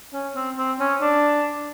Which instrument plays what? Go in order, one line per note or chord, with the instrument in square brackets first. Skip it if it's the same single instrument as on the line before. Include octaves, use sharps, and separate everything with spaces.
[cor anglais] C#4
C4
C4
C#4
D4